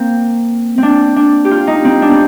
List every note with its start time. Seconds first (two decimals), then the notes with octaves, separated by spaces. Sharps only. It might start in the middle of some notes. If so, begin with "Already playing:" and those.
Already playing: A#3 C4
0.78 C4 D4
1.16 D4
1.45 G4
1.51 F4
1.67 D#4
1.84 C4
2.02 D4
2.11 C4